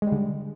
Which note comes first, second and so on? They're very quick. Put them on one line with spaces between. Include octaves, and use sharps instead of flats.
G#3 G3 D3